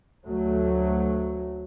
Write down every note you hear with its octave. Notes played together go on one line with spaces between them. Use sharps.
D2 F#3 A3